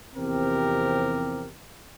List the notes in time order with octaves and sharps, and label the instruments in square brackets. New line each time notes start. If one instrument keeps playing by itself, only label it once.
[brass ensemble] E2 C3 F3 C4 G4 A#4